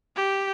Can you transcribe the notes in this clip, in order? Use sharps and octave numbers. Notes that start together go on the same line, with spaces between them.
G4